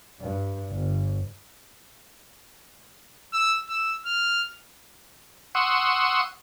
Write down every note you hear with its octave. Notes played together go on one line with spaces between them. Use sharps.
G2
G1
E6
E6
F6
F#5 C6 C#6 D#6 E6